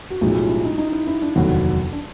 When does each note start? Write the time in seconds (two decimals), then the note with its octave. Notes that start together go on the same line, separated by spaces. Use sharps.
0.10 F#4
0.21 B1 A2 F3 G#3 G4
0.36 F4
0.49 E4
0.65 D#4
0.78 D#4
0.92 E4
1.07 E4
1.22 D4
1.36 F1 D#2 D3 F#3 B3
1.93 D4